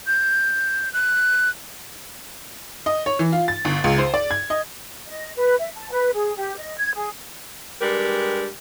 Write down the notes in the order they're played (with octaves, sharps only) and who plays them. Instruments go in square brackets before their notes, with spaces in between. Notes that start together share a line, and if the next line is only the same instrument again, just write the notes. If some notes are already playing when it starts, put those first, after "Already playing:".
[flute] G6
F#6
[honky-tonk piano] D#5
C#5
E3
F4
A6
G1
C#2
C5
D5
G#6
D#5
[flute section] D#5
B4
E5
A5
B4
G#4
G4
D#5
G#6
G#4
[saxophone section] G3 G#3 D4 G4 A#4 B4